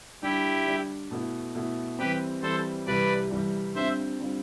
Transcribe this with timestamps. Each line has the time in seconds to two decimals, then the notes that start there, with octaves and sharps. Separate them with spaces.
0.22 D3 G3 D4 E4 G4
0.66 D3 G3 D4
1.11 B2 A3 E4
1.55 B2 A3 E4
1.98 E3 G3 C4 G4 B4
2.42 E3 G3 C4 A4 C5
2.86 C2 C3 E3 G3 B4 D5
3.31 C2 C3 E3 G3
3.75 D3 G3 C4 F4 C5 E5
4.20 D3 G3 C4 F4